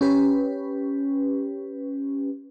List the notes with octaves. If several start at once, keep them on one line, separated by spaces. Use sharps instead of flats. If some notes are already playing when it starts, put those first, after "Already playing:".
C#4 G4 B4